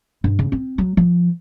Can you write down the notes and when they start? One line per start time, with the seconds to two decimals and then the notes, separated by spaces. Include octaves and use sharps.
0.24 G2
0.39 C#3
0.52 C4
0.78 F#3
0.97 F3